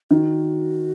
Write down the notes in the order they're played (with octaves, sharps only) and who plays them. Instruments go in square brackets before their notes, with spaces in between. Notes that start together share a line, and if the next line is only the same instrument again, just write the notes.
[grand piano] D#3 [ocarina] F#4